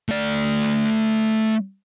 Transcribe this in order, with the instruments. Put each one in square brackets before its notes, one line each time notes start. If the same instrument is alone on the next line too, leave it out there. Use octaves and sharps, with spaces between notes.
[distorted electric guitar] A3 D5